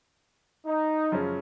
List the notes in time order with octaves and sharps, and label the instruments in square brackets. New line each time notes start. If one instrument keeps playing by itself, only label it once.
[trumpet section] D#4
[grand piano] F#2 C#3 F3 G#3 C#4